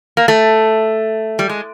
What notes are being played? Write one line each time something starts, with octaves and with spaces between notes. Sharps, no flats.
A#3
A3
G3
G#3